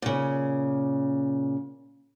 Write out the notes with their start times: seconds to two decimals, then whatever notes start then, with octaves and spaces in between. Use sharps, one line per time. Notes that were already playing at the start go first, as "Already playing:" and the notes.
0.02 A#2 C#3